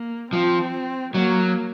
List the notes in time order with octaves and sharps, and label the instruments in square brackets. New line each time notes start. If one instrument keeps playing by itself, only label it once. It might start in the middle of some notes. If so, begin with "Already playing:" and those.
Already playing: [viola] A#3
[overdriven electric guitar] F3 [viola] C4
[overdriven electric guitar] F#3 [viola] A#3